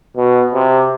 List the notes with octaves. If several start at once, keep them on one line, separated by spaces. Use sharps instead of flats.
B2
C3